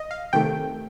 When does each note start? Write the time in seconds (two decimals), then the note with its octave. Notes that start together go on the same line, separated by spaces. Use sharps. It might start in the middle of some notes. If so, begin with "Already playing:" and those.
Already playing: D#5
0.11 F5
0.33 C3 D#3 A3 G5